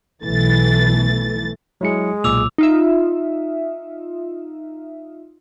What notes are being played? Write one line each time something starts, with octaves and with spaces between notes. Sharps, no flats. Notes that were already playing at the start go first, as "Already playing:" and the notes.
B1 E3 A3 A6
F#3 G#3 E4 C#7
B1 A#2 D6 E6 F7
D#4 F4 E5